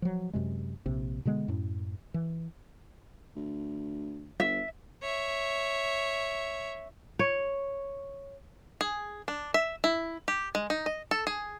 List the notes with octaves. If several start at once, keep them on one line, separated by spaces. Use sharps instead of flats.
F3 F#3
F#2 C3 G#3
A#1 C3
B2 D3 G#3 B3
F#2 A2
E3
D2
G1 E5
C#5 E5
C#5
G#4
D4
E5
E4
G4
G#3
D#4
D#5
A4
G#4